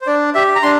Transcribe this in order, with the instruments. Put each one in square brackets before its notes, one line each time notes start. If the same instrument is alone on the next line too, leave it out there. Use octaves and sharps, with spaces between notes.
[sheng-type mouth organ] C5
D4 D5
G4 E5
A#5
D4 C6